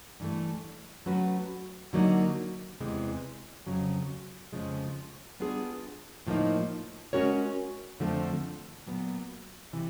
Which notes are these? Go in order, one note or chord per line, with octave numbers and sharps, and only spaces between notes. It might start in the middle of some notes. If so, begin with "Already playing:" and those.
G2 E3 A3
F#3 A3 C#4 F#4 B4
D3 F#3 A#3 D#4
E2 C3 E3 G#3
F2 C#3 F#3
F2 C#3 F3 G#3
G3 B3 D4 F4 G#4
A2 F3 A#3 D#4
G#3 C#4 F#4 A#4 C#5
F2 D3 F3 A3 C4
A#2 F#3 B3
C3 E3